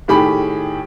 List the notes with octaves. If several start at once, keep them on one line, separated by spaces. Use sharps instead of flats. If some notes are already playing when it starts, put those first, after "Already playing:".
A2 D#3 G4 G#4 B5